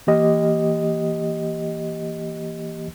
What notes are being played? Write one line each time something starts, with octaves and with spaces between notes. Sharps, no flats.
E3 A#3 G4 D#5